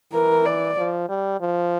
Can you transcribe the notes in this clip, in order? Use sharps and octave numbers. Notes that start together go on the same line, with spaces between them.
E3 A#4
D5
F3
G3
F3